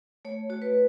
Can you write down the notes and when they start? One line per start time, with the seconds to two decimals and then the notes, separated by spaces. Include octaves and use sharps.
0.25 A3 C#5
0.50 F#4 C#5
0.62 B4